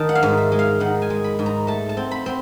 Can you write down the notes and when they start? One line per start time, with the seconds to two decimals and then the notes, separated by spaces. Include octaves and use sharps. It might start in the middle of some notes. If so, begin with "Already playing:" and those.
Already playing: D#3 A5
0.09 F#5
0.15 F5
0.23 G#2
0.37 E5
0.52 G#3
0.59 F5
0.80 D#3 F#5
1.02 G#5
1.10 G#3
1.24 B5
1.39 G#2
1.46 A#5
1.67 A3 A5
1.89 A5
1.97 C4
2.11 B5
2.26 C4